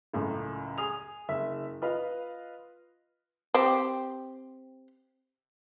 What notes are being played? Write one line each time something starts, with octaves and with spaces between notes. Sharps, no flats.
C#2 F#2 A2
G#4 D#6 F7
F#1 E5
F4 B4 D#5 F5
C4 G4